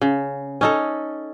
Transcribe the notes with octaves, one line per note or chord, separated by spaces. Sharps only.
C#3
C#4 D#4 A4